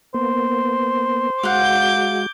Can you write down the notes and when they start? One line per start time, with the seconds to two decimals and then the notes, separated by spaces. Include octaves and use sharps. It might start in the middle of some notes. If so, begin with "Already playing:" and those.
0.14 A#3 B3 C5
1.43 G#3 F#4 F5 F#5 D6 G6